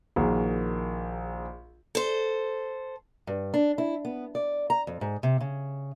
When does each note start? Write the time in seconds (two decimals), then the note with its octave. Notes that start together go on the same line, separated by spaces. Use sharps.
0.16 A#1 D#3 A#3 F#4 G#4 A#4
1.95 A4 C5
3.27 G2
3.54 D4
3.78 E4
4.05 B3
4.35 D5
4.70 A#5
4.87 F2
5.01 G#2
5.23 C3
5.41 C#3